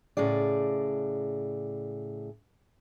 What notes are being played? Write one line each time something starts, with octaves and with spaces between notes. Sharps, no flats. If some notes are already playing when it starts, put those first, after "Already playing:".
A2 C#3 G#4 D5